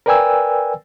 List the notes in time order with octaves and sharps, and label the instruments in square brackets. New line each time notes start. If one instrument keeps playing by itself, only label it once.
[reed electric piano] A#4 B4 D5 G5 G#5 E6